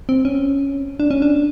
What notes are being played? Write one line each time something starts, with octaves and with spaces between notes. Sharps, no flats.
C4
C#4
D4
C#4
D4